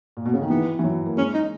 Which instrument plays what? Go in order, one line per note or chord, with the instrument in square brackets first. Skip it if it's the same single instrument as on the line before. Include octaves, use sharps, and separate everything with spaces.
[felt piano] A#2
B2
C#3
D#3
[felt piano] E3 [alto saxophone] B3
[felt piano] E3
F#3
A#3
[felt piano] G#3 [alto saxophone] C#4
[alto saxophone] D#4